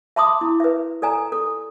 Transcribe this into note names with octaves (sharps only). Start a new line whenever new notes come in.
E5 A5 B5 C6 D6 D#6
E4
B4 E5
A4 D5 G#5 A#5
A4